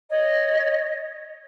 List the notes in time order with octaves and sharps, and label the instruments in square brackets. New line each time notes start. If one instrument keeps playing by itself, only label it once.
[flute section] C#5 D#5